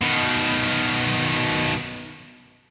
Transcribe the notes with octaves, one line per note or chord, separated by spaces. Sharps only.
B2 D#3